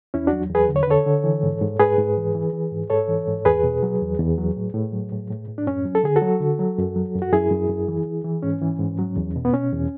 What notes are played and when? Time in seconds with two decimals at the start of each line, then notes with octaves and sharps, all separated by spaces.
0.14 E2 C#4 E4
0.27 D4 F#4
0.33 F#3
0.50 E2 G#4 B4
0.69 D3
0.76 C#5
0.83 B4
0.87 D3 A4 C#5
1.06 D3
1.24 E3
1.43 G#2
1.61 G#2
1.80 G#2 G#4 B4
1.98 G#2
2.17 E3
2.35 E3
2.53 E3
2.72 G#2
2.90 G#2 A4 C#5
3.08 E3
3.27 G#2
3.45 E2 G#4 B4
3.63 B2
3.83 F#3
4.01 E2
4.19 E2
4.38 F#3
4.57 A2
4.74 A2
4.93 F#3
5.12 A2
5.30 A2
5.48 A2
5.58 D4
5.67 F#2 C#4
5.85 F#3
5.95 A4
6.04 D3 G#4
6.16 F#4 A4
6.22 F#3
6.40 D3
6.59 F#3
6.78 F#2
6.96 F#3
7.15 F#2
7.22 F#4
7.33 F#2 E4 G#4
7.51 F#2
7.70 F#2
7.88 E3
8.06 E3
8.24 E3
8.43 G#2 C#4
8.61 E3
8.79 G#2
8.99 F#3
9.16 E2
9.36 B2
9.45 B3
9.53 B2 C#4
9.72 E2